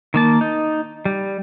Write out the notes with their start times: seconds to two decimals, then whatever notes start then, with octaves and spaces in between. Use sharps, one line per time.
0.14 D#3 A#3 A5
0.41 D#4
1.05 G3